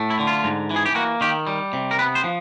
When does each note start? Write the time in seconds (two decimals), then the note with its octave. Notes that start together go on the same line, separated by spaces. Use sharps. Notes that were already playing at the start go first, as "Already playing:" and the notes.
Already playing: A2 A3
0.10 E4
0.19 D3
0.27 F4
0.44 G#2
0.70 E3
0.76 G#4
0.86 G4
0.95 A#3 F#4
1.21 D#3 G4
1.47 G3
1.73 C3
1.91 A#4
1.99 B3 B4
2.15 C5
2.24 F3